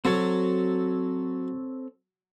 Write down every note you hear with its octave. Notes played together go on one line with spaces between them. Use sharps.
F#3 C4 A4 C#5